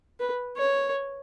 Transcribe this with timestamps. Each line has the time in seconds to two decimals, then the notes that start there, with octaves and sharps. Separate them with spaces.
0.20 B4
0.57 C#5